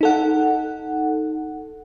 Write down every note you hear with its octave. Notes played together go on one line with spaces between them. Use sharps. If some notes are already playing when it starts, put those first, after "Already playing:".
D#4 A4 F#5